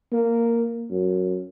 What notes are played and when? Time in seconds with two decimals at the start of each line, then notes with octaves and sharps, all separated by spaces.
0.12 A#3
0.91 F#2